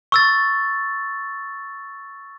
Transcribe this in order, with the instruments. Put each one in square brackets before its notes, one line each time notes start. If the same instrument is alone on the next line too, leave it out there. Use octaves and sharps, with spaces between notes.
[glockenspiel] C#6 E6 A6